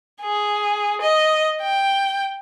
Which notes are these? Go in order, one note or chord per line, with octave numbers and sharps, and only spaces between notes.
G#4
D#5
G5